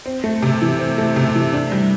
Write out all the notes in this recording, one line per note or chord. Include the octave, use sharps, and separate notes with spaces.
C4
A3
C3
E3
C4
A3
C3
E3
D4
G3